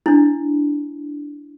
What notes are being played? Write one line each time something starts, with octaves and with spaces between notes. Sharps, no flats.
D4 E4